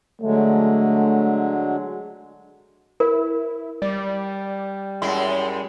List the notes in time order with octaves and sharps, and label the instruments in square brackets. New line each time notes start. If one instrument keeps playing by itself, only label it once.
[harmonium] D3 F#3 G#3 [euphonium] A3
[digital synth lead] E4 [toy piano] A#4
[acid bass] G3 [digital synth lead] D5
[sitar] F#2 G#3 E4 [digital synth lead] C6